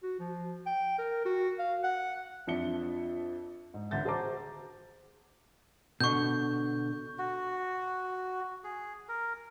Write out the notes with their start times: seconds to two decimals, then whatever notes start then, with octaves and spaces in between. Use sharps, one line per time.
0.03 F#4
0.20 F3
0.66 G5
0.99 A#4
1.25 F#4
1.59 F5
1.84 F#5
2.47 F2 F3 D4 E5 C#7 G7
3.74 G#2
3.91 C#2 D3 E5 G6 A6
4.04 F#4 G#4 C5 A5 A#5 D6
6.00 B2 D3 C#6 G6
7.18 F#4
8.64 G#4
9.09 A#4